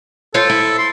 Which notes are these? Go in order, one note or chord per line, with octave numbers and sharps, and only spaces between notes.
F4 A4 C5 C#5
E4
C6